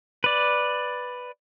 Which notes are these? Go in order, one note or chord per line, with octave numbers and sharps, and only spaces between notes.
B4 D5